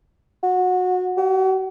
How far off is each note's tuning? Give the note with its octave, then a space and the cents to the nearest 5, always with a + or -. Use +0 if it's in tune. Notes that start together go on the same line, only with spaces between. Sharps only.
F#4 -20
F#4 +45